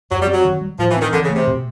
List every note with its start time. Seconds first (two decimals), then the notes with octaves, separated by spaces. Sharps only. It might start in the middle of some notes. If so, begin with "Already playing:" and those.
0.11 F#2 F#3
0.22 G3
0.27 C4
0.33 F#3
0.45 D#3
0.61 G3
0.79 A2 F3
0.90 E3
0.97 D#3 C4
1.13 D3 E3
1.24 C#3
1.30 A3
1.36 C3
1.47 B2